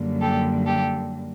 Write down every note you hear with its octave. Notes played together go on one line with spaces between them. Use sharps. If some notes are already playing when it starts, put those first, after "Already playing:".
Already playing: F#2 D3 G3 A#3
G4 A4
G4 A4